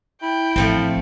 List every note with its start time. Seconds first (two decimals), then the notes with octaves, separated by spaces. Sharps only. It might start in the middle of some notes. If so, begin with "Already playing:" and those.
0.22 E4 G5
0.56 A1 F3 A3 C4